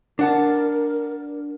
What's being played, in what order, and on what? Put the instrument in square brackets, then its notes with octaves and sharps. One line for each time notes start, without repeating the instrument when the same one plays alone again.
[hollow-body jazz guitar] D4 F#5 A5 [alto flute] A#4